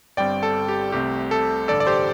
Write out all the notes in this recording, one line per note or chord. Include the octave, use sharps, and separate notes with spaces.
G1 G2 G3 C4 D5 G5
A4
G4
C2 C3 A3 C4 G4
A4
A1 G2 D3 A4 D5
D5
G4 C5